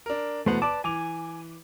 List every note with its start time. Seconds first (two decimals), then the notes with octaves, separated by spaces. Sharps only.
0.06 D4 A#4
0.46 E2 B2 A3 B3 C5 F#5
0.62 B4 D5 A5 D6
0.84 E3 G#5 D6 F7